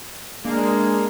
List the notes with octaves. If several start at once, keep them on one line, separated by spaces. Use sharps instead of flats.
G#3 A#3 D4